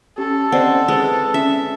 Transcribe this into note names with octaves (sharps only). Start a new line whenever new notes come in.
C#4 G4 A4
C4 D5 D#5 F#5
G#3 B4 E6
C#4 E5